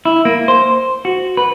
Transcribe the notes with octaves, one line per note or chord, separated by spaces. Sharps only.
E4
A#3
C5
F#4
B4